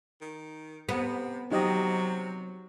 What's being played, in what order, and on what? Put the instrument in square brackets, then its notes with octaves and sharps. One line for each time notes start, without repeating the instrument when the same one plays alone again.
[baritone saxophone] D#3
[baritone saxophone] C3 [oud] B3
[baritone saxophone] C3 [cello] F#3 [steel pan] D#4 G4 D#5